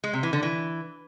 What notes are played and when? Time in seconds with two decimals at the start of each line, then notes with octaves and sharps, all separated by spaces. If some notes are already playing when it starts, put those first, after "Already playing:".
0.04 G#3
0.13 C3
0.23 E3
0.33 D3
0.43 E3